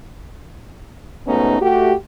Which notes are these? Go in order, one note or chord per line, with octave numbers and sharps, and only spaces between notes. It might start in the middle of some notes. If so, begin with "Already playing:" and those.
G#2 B2 A3 B3 C#4 D#4
A3 F#4 G4